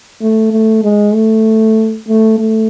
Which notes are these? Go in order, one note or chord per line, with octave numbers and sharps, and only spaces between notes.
A3
A3
G#3
A3
A3
A3